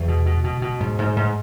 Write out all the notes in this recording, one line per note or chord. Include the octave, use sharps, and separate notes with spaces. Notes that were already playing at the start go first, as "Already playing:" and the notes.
Already playing: E2 G#3
B2
B2
B2
B2
G#2
G#2
G#2